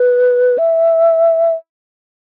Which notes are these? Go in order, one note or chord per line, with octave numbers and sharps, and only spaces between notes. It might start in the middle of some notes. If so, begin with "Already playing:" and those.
Already playing: B4
E5